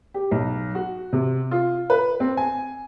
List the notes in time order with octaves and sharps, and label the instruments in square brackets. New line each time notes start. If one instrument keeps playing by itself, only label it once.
[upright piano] G4
B1
F#4
C3
F4
B4
C4
G#5